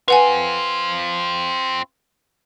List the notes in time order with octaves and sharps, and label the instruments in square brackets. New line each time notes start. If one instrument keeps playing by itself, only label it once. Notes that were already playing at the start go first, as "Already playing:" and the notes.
[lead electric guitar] C4 F4 [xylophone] B4 F#5 G#5